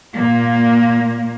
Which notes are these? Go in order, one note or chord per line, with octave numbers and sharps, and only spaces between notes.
A#2 A#3